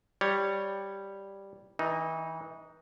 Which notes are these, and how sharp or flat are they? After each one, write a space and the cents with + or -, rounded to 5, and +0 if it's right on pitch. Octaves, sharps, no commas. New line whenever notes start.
G3 +0 C#5 +0
E3 -30 D#4 +0